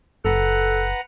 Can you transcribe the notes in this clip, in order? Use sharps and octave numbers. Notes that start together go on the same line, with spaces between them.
F#1 A4 B4 F#5 A#5